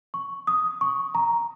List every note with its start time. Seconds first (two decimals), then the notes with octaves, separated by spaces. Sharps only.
0.14 C#6
0.47 D#6
0.81 C#6
1.15 A#5